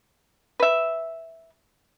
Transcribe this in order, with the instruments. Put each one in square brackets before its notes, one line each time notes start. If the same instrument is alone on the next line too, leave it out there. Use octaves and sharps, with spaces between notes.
[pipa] B4 E5